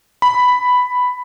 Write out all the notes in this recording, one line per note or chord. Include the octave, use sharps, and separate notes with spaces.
B5